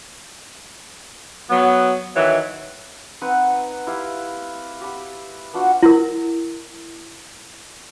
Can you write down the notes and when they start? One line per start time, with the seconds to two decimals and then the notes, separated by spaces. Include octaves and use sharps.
1.50 F#3 B3
2.16 D#3 E3 F#3 E4
3.22 C4 D#4 B4 F#5
3.87 E4 G4 F5
4.81 G4 B5
5.53 B3 D4 F4 F#4
5.83 E4 A#4